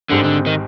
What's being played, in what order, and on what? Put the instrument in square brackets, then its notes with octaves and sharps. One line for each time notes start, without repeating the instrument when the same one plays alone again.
[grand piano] G#1 G#2 G3 C4 [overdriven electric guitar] D3
[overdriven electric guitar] D3
D#3